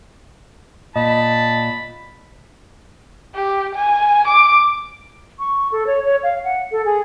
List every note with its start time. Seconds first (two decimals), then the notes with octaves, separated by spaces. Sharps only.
0.96 A#2 D#5 A5 B5
3.34 G4
3.75 G#5
4.27 D6
5.39 C#6
5.72 A4
5.87 C#5
6.05 C#5
6.23 F5
6.44 F#5
6.72 A4
6.85 G#4